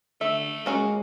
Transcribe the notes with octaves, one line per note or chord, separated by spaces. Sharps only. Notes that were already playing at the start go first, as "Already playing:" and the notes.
D3 A3 E5
G#3 A#3 C#4 F#4